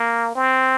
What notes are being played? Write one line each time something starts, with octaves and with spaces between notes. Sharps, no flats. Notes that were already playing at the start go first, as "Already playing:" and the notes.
Already playing: A#3
C4